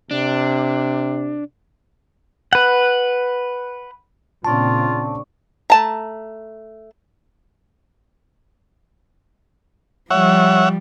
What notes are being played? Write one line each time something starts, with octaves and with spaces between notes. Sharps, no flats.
C3 D4
B4 F#5
A#2 C#3 C4 D4 F4 D5 A5 C#6
A3 A5 A#5
F3 G3 C#5 E5 F#5